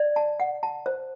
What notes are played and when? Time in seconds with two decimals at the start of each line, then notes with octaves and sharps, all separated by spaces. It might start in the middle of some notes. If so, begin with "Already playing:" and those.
Already playing: D5
0.16 A5
0.40 F#5
0.63 A5
0.86 C5